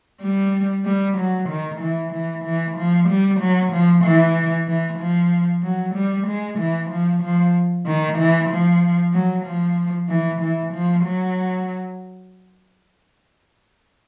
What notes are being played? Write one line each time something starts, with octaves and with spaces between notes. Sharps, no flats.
G3
G3
F#3
D#3
E3
E3
E3
F3
G3
F#3
F3
E3
E3
F3
F#3
G3
G#3
E3
F3
F3
D#3
E3
F3
F#3
F3
E3
E3
F3
F#3